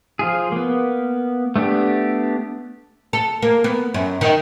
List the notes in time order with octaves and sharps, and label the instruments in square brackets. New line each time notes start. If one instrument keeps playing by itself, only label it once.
[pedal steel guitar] F3 F4 G#4
A#3 B3
A3 B3 D4 G4
[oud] A4
A#3
B3
F#2
D#3